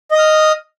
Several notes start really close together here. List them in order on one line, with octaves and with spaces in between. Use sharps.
D#5 D#6 F6